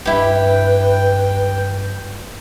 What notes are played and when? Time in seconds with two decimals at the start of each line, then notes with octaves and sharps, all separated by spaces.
0.05 G2 E4 G4 B4 G5